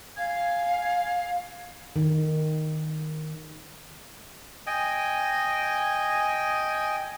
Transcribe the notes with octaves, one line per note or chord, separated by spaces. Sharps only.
F5 G#5
D#3
D#5 G5 G#5